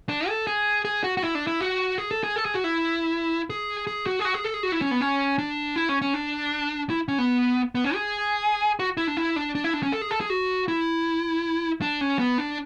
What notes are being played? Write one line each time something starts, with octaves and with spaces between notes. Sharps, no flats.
D4
A4
G#4
G#4
F#4
F#4
E4
D4
E4
F#4
G#4
A4
G#4
A4
G#4
F#4
E4
G#4
G#4
F#4
G#4
F#4
G#4
A4
G#4
F#4
E4
C#4
B3
C#4
D4
E4
C#4
C#4
D4
E4
C#4
B3
B3
C#4
G#4
F#4
E4
D4
E4
D4
D4
E4
D4
C#4
A4
G#4
A4
G#4
F#4
E4
D4
C#4
B3
D4